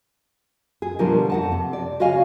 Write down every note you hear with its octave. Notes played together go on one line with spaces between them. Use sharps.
G#4
B2 D3 F3 G3 A#3 A#4
F2 F#5 A5
C3
D5
C#3 F#4 C#5 D#5 F5 G#5